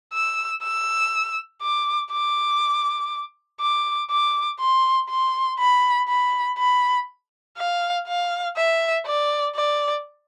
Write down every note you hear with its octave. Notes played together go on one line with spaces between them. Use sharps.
E6
E6
D6
D6
D6
D6
C6
C6
B5
B5
B5
F5
F5
E5
D5
D5